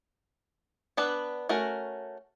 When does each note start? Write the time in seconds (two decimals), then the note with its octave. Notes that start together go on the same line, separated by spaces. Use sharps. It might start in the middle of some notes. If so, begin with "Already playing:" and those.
0.97 B3 D4 B4
1.49 A3 C#4 F#4 A#4